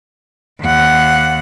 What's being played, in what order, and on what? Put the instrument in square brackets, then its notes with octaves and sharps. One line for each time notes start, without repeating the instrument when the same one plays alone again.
[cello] D#2 F#5